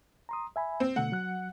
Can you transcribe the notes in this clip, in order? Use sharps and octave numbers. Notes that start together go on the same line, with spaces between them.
A#5 C6 D#6
E5 G#5 B5
C4
B2 D3 A3 F#5
F#3 F#6